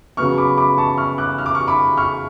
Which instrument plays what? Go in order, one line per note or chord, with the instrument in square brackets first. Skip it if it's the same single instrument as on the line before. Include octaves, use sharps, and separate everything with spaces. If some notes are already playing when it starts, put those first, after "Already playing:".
[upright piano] C#3 F#3 B3 C#6 F6
B5 D6
B5 D6
A5 C#6
C#6 F6
D6 F#6
F6
D6
C#6 F6
B5 D6
C#6 F6